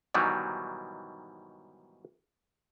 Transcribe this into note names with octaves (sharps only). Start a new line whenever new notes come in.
G#2 B2 D#3 E3 F#3 G3